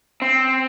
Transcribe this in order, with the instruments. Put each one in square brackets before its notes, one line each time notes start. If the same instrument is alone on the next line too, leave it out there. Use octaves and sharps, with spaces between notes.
[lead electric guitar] C4